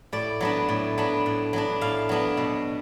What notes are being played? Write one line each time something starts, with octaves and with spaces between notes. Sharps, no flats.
A2 D5
F#3 B3 D4
A2
F#3 B3 D4
A2
F#3 B3 D4
A2 F5
F#3 B3 D4
B2